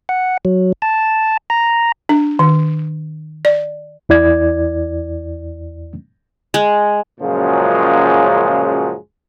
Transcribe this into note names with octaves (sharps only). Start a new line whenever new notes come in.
F#5
F#3
A5
A#5
D4
D#3
D5
E2 E4 D5 G#6
G#3
F#2 A#2 C#3 F3 F#3 G#3